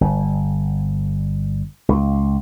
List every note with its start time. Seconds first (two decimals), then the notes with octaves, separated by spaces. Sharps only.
0.01 G1
1.89 C#2